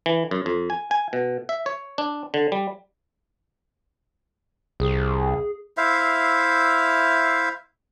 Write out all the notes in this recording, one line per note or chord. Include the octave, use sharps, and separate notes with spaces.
E3
F#2
F2
G#5
G#5
B2
E5
C#5
D4
D3
G3
C2 G#4
E4 C5 E5 F5